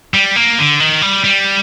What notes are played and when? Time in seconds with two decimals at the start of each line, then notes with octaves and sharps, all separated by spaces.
0.14 G3
0.36 A#3
0.58 D3
0.80 D#3
1.02 G3
1.24 G3